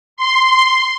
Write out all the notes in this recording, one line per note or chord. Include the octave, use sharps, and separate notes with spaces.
C6